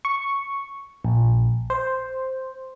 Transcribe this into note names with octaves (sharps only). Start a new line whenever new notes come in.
C#6
A#1
C5